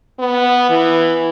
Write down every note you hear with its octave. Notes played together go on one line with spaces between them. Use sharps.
B3
E3